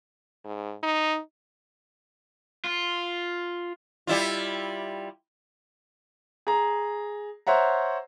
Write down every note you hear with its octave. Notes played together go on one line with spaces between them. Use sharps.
G#2
D#4
F4
G3 E4 F4
G#4 A#5
C5 C#5 E5 F#5 A#5